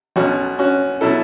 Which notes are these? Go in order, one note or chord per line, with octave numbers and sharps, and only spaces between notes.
B1 B2 F#3 C#4 F#4
C#4 F#4
B2 F#3 E4 A4